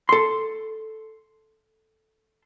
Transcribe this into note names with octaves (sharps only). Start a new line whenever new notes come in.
A4 C6